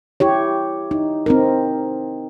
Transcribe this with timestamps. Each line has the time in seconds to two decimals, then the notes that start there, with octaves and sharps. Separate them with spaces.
0.20 E4 G4 C#5
0.91 D#4
1.26 C4 D#4 A#4